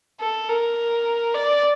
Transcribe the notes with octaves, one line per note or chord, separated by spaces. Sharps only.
A4
A#4
D5